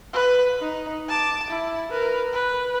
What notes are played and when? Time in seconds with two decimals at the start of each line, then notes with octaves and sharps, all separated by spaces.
0.13 B4
0.59 D#4
1.09 A5 D6
1.50 E4
1.90 A#4 B4
2.33 B4